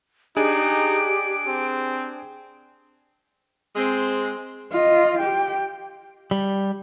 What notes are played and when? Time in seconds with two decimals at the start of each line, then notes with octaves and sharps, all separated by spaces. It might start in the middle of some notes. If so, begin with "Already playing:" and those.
0.37 D4 D#4 G4 G#4 D7
1.47 C4
3.76 G#3 C4
4.72 F4 D#5
5.19 G4 G5
6.31 G3